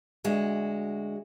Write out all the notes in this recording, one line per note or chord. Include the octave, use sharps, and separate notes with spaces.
D2 G#3 F#4